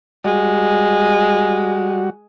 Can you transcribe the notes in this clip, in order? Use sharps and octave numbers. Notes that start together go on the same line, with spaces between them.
G3 G#3 F#4